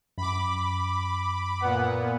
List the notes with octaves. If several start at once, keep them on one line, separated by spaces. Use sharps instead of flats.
F#2 B5 D6
A#2 B3 F#5